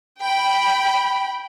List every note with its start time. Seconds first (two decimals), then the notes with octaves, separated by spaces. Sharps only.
0.22 G5 B5